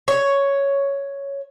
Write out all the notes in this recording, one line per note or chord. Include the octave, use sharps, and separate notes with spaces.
C#5